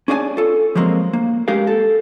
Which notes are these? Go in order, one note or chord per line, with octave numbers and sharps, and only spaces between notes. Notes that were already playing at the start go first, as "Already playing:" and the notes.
C#4 G#4 D5 D#5 G#5 A5
F4 A4
F3 F#3 G#3 A#3 C4
A#3
G#3 C#4 G4 A#4 F5
A4